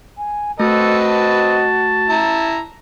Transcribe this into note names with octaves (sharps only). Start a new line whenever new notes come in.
G#5
A3 C4 F#4 A4 B4 D#5
A5
E4 A#5